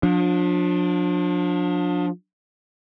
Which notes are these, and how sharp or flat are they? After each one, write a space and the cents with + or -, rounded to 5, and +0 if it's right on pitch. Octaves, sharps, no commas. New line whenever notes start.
F3 +35 D4 +0